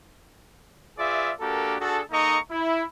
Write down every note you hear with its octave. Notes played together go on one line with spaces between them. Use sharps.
F4 G#4 B4 D5 E5
A#3 D4 F#4 G4 A4 A#4
D4 F#4 G#4 A4
A#3 D#4 A4 D#5 A#5 C#6
E4